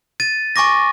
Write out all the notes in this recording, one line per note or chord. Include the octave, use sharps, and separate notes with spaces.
A6 D#7
G#5 C#6 D6 A#6